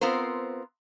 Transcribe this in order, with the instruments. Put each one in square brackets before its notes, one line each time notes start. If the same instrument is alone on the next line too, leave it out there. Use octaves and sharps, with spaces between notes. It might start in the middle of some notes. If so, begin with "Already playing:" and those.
[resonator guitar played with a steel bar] B3 C4 F4 A#4 C5